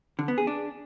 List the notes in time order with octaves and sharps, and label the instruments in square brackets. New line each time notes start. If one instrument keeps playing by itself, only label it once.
[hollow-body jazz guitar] D3
B3
G#4
D4